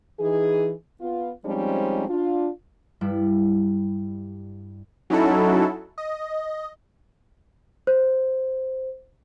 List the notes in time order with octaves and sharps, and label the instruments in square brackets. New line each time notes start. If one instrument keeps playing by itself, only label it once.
[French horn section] E3 D#4 G#4
B3 F4
F3 G3 G#3 C4 C#4 D#4
D4 F4
[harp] G2 G3 E4
[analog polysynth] F#3 C#4 D#4 E4 F#4 A4
D#5
[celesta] C5